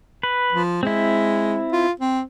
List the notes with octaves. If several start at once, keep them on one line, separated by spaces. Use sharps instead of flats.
B4
F3
G#3 C4 E4
F4
C4